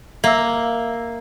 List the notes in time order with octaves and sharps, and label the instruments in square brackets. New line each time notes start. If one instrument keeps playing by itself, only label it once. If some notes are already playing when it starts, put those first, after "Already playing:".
[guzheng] A#3 [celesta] E5 E6